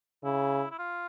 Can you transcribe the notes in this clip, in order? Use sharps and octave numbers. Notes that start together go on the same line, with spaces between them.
C#3 E4
E4
F4